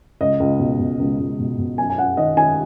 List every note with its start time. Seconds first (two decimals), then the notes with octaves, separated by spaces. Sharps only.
0.21 C#2 D#5
0.40 C#2
0.59 B2
0.79 B2
0.99 C#2
1.19 C#2
1.39 B2
1.59 B2
1.78 F#2 G#5
1.90 G#5
1.98 F#2 F#5
2.17 D#3 D#5
2.37 D#3 G#5